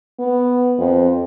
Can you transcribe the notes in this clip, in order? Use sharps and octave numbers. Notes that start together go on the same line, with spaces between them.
B3
F2